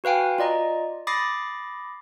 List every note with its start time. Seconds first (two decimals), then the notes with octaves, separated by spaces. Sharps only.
0.04 F#4 B4 F5 G5 G#5
0.38 F4 D5 D#5 A#5
1.07 B5 D6 D#6 A6 A#6 C7